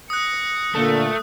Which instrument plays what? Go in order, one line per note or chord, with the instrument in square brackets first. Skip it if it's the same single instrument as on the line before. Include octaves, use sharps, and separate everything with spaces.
[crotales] D#6 F#6 [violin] A#6 C#7
[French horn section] A#2 D3 A#3 [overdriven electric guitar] A3